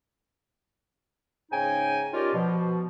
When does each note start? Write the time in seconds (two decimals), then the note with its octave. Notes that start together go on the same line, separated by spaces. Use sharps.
1.51 G#2 C#3 D#4 G5 G#5
2.13 C#4 D#4 F4 G4 A#4 D5
2.34 B2 F3